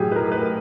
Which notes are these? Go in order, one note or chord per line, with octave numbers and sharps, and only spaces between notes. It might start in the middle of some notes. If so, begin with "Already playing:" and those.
Already playing: A2 F#3 G4 G#4
B4
A#4
B4